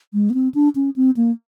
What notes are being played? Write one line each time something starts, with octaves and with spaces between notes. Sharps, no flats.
G#3
B3
C4
D4
C#4
C4
A#3